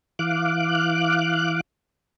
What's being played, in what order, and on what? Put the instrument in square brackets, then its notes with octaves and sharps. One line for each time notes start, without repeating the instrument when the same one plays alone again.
[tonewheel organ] E3 F5 D6 F#6